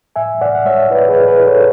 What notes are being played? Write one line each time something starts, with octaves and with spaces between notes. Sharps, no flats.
A2 E5 G#5
A2 D5 F#5
F#5
G#3 C#5 E5
E4 B4 D5
G#4 B4
A2
G#4 B4
E4
A4 C#5